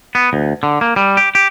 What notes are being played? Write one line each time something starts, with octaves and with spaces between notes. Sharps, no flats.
B3
D2
D3
A#3
G3
G4
G4